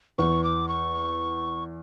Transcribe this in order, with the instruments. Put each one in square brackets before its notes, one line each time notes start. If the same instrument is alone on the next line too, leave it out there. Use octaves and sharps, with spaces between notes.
[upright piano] E2 E3 [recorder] C#6
[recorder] D6
C#6